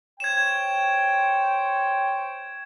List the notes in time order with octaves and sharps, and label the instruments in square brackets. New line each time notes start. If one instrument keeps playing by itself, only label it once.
[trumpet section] C5 C#5 G5 [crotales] G#6 E7